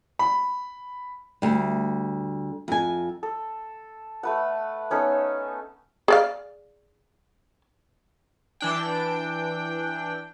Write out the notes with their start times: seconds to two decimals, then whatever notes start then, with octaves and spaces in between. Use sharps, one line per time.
0.19 B5
1.42 D2 G3
2.68 F2 G#5
3.23 A4
4.23 A3 B4 F#5
4.90 B3 C#4 D#4 A4
6.08 G#4 D5 F5
8.61 E3 D4 G5